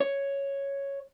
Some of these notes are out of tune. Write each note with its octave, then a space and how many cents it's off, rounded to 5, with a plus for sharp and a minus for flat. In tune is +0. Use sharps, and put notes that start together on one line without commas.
C#5 +0